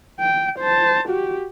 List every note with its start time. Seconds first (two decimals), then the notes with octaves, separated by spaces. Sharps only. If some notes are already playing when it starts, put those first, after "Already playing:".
0.20 G5
0.59 C5 A5
1.08 F#4 G4